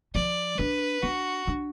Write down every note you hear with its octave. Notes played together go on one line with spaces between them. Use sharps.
F3 D5
D4 B4
D4 F#4
D4